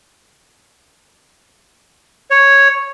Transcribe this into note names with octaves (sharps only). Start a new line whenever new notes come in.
C#5